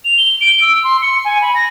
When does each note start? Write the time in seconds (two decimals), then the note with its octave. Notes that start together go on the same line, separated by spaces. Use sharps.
0.05 F7
0.18 G7
0.41 D7
0.62 E6
0.84 C6
1.02 C#7
1.25 G#5
1.41 B5
1.55 A#6